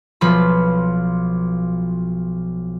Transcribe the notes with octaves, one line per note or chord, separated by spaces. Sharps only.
B1 F3 F4 B5